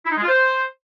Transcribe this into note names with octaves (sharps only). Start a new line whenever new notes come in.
E4
D#4
G#3
F4
C5